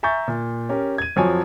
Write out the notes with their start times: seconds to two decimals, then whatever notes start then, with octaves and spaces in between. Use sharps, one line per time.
0.03 E5 G#5 A#5 C#6 G6 A6
0.28 A#2
0.69 C#4 G4 A#4
0.98 G#6 D#7
1.16 F2 F3 F#3 C#5 G#5